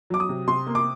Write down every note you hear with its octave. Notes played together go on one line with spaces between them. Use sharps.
F#3 D6
D#6
C3
C3 C6
A#3
D6